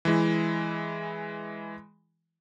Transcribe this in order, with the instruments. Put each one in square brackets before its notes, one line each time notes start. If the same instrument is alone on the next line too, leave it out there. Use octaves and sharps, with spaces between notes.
[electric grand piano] E3 G#3 E4